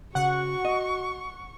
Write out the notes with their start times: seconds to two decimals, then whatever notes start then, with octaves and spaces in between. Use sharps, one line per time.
0.15 C#3 F#4 F#5 C#6
0.65 D#5